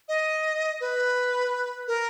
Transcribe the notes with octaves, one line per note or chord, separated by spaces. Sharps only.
D#5
B4
A#4